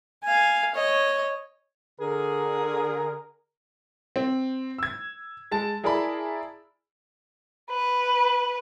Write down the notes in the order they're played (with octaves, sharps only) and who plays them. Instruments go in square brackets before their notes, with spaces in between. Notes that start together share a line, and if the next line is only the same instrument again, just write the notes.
[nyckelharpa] F5 G#5
C#5 D#5
[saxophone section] D3 G#4 [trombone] A#4
[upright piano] C4
E6 G#6
G#3 A5
E4 G#4 A#4 D5 A5 B5
[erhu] B4